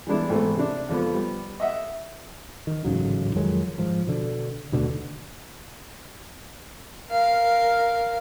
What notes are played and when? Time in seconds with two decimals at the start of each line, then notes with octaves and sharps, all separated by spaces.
0.07 E3 G3 G#3 B3 D4 E4
0.29 G#1 G#2 E3 A3 B3 E4
0.56 C3 D4
0.89 F2 D3 F3 B3
1.14 G3 B3
1.60 D#5 E5 F#5
2.67 D#3
2.85 A1 G#2 C#3 F#3
3.35 F2 D#3 F#3 G#3
3.78 G#2 F3
4.07 B2 D3
4.72 D#2 B2 D3 A3
7.10 A#4 F5